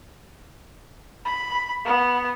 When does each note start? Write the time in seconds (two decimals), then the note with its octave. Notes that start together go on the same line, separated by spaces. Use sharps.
1.25 B5
1.85 B3